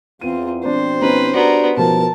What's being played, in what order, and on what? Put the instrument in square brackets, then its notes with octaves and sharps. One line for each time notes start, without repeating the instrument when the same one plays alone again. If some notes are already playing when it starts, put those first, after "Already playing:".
[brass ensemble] E2 [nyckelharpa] C4 F4 [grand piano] D#7
[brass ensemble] B2 F3 C4 [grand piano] D4 [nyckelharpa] C5
[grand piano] B3 C#4 D#4 [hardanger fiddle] B4
[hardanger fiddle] B3 A#4 [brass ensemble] D4 G4 D5 [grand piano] F#4
[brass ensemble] F#1 G3 [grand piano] B2 F3 [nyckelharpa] A#4 [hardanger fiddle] A5